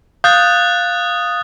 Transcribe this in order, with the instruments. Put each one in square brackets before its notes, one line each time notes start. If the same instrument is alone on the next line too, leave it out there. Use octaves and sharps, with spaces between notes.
[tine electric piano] F5 G6 [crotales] D#6 F#6 A6